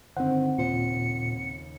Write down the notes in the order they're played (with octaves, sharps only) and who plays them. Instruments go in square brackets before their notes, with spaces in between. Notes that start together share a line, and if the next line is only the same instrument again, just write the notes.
[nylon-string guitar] G2 D3 D#3 [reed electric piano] C4 F#5 [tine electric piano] C5
[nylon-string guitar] D#2 C#3 C5 [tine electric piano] A#2 [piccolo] C#7